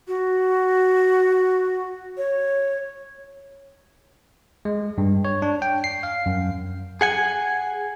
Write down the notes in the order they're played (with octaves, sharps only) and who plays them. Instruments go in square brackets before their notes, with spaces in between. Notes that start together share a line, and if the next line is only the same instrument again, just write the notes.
[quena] F#4
C#5
[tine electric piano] G#3
G2
C#5
D4
G5
C7
F5
F#2
[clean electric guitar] G#4 F#5 G#5